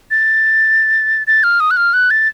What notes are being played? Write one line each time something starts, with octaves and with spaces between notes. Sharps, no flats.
A6
A6
F6
D#6
F#6
F6
F#6
A6